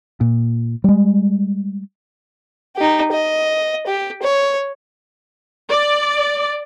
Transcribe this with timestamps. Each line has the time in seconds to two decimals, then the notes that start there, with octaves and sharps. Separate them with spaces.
0.21 A#2
0.84 G3 G#3
2.76 D#4 G4
3.12 D#5
3.87 G4
4.23 C#5
5.70 D5